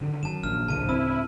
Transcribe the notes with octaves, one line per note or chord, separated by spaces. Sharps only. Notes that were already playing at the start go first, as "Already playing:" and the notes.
D3 D#3
F#2 D#3 A5 E7
A#1 F6
D2 A2 C#3 A5 D#7
C4 E4 E6